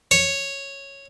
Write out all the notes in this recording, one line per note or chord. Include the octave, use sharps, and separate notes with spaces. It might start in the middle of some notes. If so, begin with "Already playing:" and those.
C#5